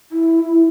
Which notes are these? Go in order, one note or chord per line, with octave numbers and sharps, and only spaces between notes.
E4